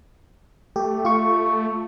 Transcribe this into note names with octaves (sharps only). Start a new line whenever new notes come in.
A3 G4
F4 C#6